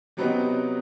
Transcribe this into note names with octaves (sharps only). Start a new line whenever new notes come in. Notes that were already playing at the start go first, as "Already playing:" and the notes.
C3 F#3 B3 C4 D#4